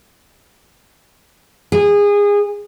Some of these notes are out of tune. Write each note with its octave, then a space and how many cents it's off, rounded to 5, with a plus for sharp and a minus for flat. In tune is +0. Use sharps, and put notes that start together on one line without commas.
G#4 -25